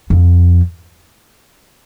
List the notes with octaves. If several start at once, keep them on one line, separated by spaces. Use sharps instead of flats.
F2